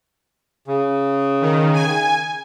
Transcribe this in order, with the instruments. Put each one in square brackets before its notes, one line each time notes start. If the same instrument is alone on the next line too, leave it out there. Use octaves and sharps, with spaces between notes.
[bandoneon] C#3
[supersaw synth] D#3
G#5